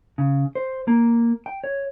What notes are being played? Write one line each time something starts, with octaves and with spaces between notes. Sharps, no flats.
C#3
C5
A#3
G5
C#5